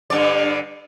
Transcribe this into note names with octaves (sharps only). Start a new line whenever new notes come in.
G2 D3 D5